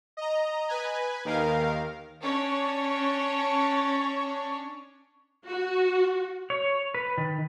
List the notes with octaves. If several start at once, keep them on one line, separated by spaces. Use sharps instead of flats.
D#5 A#5
B4 G#5
D#2 D#3 A#4 F5
C#4 D4 C#5
F#4
C#5
B4
D#3